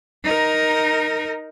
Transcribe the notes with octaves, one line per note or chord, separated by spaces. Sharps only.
D#4 A#4